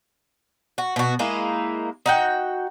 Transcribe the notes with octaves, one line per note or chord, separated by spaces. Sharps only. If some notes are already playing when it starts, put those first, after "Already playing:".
F#4
B2 F#4
G#3 A#3 D#4 E4
D#4 F#4 G5